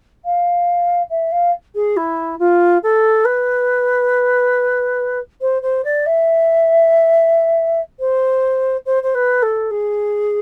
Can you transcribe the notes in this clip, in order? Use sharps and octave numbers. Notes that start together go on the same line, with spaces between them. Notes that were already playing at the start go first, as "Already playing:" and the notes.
F5
E5
F5
G#4
E4
F4
A4
B4
C5
C5
D5
E5
C5
C5
C5
B4
A4
G#4